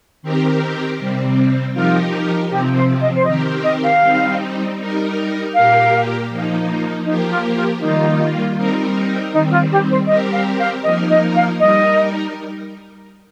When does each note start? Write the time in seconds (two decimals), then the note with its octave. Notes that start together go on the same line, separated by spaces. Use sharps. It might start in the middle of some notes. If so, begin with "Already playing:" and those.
0.22 D#3 C4 G4 A#4
0.98 C3 G3 C4
1.74 F3 D#4 F4 G4 A#4
2.50 C3 F3 C4 G4
2.75 C5
3.01 D#5
3.15 C5
3.26 D#3 C4 G4 A#4 D#5
3.64 D#5
3.83 F5
4.02 G3 C4 D#4
4.77 G3 D#4 A#4
5.54 A#2 A#3 G4 A#4 F5
6.29 F3 A#3 D#4
7.05 F3 A#3 D#4 G4 A#4
7.30 F4
7.55 F4
7.81 D#3 G3 A#3 D#4 F4
8.57 G3 C4 D#4 A#4
9.33 D#3 G3 C4 D#4
9.51 F4
9.71 G4
9.90 C5
10.08 G3 C4 G4 A#4 D#5
10.33 F5
10.59 F5
10.84 F3 A#3 D#4 A#4 D#5
11.10 D#5
11.35 F5
11.60 G3 D#4 A#4 D#5